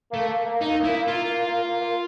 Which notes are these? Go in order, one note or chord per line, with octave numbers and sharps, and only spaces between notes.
A3 A#3
A#3
A#3
A#3 D#4
A#3
E4
A#3
F4
A#3
A#3
A#3
A#3
A#3